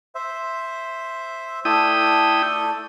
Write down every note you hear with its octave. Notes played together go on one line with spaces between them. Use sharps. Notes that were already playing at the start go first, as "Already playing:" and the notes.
C5 E5
A3 E4 A4 D5 G5 D#6